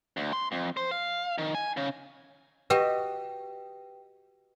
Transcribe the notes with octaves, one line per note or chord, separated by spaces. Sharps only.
D2
C6
F2
C5
F5
D#3
G#5
C#3
F#4 G4 B4 D#5 G5